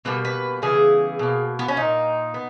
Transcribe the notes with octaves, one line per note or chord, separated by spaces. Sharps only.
B2 G3 A#3 B4
B4
C#3 E3 G3 B3 G#4
B2 A#3
B3
C#4
A#2 A#3 D#4
B3